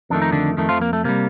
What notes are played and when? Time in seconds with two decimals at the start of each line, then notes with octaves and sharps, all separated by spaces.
0.10 F2 D#3 A3 D4
0.22 D#4
0.32 D3 D4
0.57 F2 D#3 A3
0.69 F3 F4
0.81 A#3
0.93 A3
1.04 C3 G3 A#3